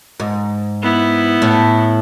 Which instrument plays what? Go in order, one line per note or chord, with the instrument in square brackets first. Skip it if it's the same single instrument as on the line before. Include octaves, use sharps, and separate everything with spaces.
[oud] G#2
[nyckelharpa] B3 E4
[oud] A2